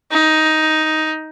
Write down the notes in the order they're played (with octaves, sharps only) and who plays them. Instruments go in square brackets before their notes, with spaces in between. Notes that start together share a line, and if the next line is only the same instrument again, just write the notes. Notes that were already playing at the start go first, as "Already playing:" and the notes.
[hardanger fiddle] D#4